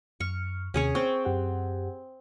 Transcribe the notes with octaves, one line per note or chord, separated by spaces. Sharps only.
F#2 C#6 F6
D#2 C3 C#4 G#4 C#5
C4 C#6
F#2 G4 F#5